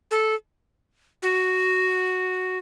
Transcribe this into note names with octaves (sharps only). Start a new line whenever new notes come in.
A4
F#4